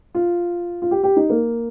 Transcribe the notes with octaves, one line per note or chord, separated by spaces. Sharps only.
F4
F4
G4
G4
D#4
A#3